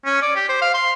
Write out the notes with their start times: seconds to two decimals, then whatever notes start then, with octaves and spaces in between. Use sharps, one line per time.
0.05 C#4
0.22 D5
0.36 G4
0.49 C5
0.62 F5
0.74 C6